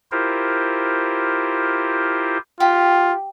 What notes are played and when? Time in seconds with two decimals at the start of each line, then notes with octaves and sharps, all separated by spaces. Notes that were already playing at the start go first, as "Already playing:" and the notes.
0.12 E4 F4 G4 A#4 C5
2.60 F4 G4